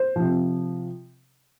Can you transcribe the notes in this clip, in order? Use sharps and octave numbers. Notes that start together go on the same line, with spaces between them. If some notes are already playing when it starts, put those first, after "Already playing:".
Already playing: C5
C3 F3